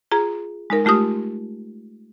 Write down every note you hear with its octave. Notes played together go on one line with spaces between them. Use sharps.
F4 G#4 A#5
G#3 D#4 A#4
G#3 A3 F4 G4 D#6